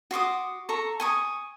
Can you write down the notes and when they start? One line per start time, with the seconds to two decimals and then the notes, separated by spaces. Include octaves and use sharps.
0.11 F#4 C6 D6 D#6
0.69 A4 A#5 C#6
1.00 G#5 C#6 D#6